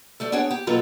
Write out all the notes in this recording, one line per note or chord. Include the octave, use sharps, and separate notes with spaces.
G3 A3 A4
B3 D4 G#4 C#5 F#5 G5
G4
B2 F#3 A#3 B3 F4 A4